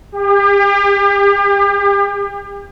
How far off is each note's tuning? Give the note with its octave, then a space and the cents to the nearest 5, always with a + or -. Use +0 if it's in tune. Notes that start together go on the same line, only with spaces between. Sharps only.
G4 +40